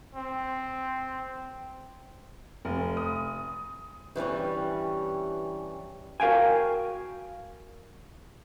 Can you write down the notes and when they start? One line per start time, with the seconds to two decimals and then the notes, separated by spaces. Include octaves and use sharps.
0.15 C4
2.65 F1
2.97 D#6
4.16 G2 E3 G3 C#4
6.20 F#4 A#4 F5 G5 G#5